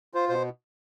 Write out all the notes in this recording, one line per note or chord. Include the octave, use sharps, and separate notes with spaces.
F4 C5
B2 C5